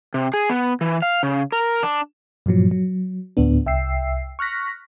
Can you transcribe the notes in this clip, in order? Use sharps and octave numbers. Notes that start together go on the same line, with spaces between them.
C3
G#4
B3
E3
F5
C#3
A#4
D4
G2 A#2 F3 F#3
F#3
D2 A2 B3 D4
C2 E5 G5 E6 C7
C#6 F6 F#6 A#6 B6